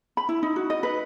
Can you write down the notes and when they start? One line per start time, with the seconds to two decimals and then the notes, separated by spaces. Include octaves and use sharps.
0.17 B5
0.29 E4
0.43 D#4
0.56 F#4
0.70 D#5
0.83 B4